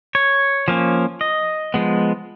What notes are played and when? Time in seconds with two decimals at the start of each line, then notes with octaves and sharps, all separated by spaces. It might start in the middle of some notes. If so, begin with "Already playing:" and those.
0.15 C#5
0.68 F3 A#3 C#4
1.21 D#5
1.74 F3 G#3 B3